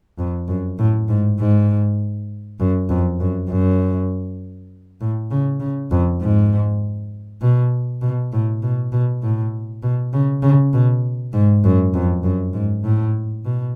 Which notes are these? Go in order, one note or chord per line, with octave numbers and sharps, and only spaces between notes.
F2
F#2
A2
G#2
G#2
F#2
F2
F#2
F#2
A2
C#3
C#3
F2
G#2
B2
B2
A2
B2
B2
A2
B2
C#3
C#3
B2
G#2
F#2
F2
F#2
G#2
A2
B2